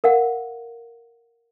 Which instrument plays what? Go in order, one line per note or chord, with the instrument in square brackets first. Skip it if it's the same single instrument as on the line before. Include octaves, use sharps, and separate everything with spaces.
[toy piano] A#4 F5 F#5